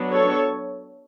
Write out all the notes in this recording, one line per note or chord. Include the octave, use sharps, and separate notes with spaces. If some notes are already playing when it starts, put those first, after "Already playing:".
Already playing: F#3 B3 D4
A4 C#5